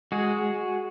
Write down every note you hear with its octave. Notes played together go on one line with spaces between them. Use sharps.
G#3 F#4 G#4